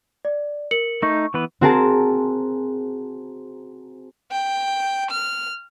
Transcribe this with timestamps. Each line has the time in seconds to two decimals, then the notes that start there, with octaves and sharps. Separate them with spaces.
0.25 D5
0.71 A#4 C#7 F#7
1.02 A3 D#4 C#6
1.34 E3 B3 B4
1.61 C4 F#4 G#4 A#4 C5 A5
4.32 G5
5.11 F6